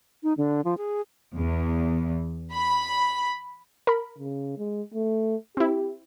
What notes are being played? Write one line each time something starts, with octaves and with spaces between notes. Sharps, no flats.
D#4
D3
F3
G#4
E2
B5
A#4 B5
C#3
G#3
A3
C4 E4 G4